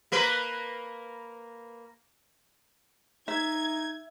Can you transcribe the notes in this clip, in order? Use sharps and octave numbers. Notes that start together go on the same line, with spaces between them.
A#3 A#4 B4
D#4 E5 G#6